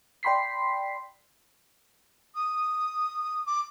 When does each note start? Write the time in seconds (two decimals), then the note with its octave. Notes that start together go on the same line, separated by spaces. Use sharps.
0.23 D5 G5 B5 C6 B6 C7
2.34 D#6
3.46 D6